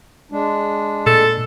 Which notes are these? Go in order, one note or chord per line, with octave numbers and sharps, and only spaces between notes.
G#3 D4
A#2 A4